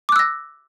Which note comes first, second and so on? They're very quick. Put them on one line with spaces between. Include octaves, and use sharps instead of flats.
D6 F#6 E6 A#6